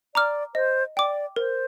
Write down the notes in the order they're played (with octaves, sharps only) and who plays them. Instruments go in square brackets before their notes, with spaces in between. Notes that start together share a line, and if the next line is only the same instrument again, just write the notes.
[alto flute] D5 [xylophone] A#5 D6 F6
[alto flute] C5 [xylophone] D#5
[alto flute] D5 [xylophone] G5 D6
[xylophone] A#4 [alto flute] C5